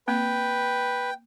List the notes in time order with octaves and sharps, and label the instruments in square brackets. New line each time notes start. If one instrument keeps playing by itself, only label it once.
[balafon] A#3 C4 [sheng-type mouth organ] B4 [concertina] G5